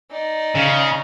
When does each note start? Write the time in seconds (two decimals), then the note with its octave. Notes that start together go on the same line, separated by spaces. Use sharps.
0.11 D#4 D5
0.55 C#3